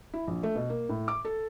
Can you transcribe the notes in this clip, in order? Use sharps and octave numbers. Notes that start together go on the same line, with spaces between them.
E4
A#1
A3
B2
A#3
A2
D6
A4